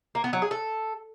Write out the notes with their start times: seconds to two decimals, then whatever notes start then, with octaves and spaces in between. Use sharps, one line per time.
0.15 A#3
0.24 B3
0.33 F#3
0.42 G#4
0.51 A4